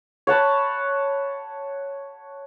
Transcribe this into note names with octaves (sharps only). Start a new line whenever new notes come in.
C#5 F#5 A5 B5